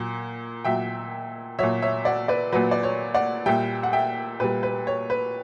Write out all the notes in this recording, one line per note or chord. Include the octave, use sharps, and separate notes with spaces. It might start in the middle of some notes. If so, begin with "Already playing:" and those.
Already playing: A#2 F#3
A#2 F#3 E5 G5
A#2 F#3 C#5 E5
C#5 E5
D5 F#5
B4 D5
A#2 F#3 B4
D5
C#5
D5 F#5
A#2 G3 E5 G5
F#5
E5 G5
A#2 G3 B4
B4
C#5
B4